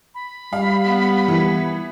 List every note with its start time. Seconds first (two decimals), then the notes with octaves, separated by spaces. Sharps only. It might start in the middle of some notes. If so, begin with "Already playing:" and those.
0.15 B5
0.53 G3 F5
0.84 B3
1.28 E3